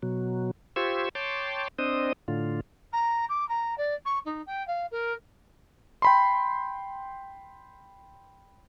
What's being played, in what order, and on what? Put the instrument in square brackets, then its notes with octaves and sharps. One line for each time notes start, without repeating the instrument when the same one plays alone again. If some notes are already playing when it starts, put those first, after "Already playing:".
[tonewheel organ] B2 F#3
F4 G4 C5 C#6 E6 G#6
C#5 G5 A5 C6 D6
C4 D4 C5 D#5 D#6
A2 D3 F4
[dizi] A#5
D6
A#5
D5
C#6
D#4
G5
F5
A#4
[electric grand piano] G5 B5 C6